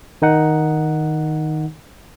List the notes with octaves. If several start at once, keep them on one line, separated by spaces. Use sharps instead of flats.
D#3 D#4 F#5